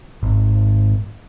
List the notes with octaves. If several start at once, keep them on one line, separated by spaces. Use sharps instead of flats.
G#1